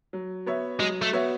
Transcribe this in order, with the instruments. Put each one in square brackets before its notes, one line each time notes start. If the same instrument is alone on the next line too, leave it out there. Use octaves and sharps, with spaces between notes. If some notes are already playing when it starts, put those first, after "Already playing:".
[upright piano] F#3
B3 F#4 C#5 E5
[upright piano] F#3 [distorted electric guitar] G#3
[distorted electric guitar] A3
[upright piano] B3 F#4 C#5 E5